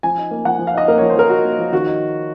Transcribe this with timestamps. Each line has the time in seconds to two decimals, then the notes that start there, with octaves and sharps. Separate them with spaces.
0.03 F3 G#5
0.17 D#4
0.31 A#3
0.45 F3 F#5
0.59 F3
0.67 F5
0.74 D#4 D#5
0.88 A#3 A#4
0.98 C#5
1.02 F3
1.10 C5
1.16 F3 A#4
1.30 D#4 F#4
1.45 A#3
1.59 F3
1.72 D#3 F#4
1.87 D#4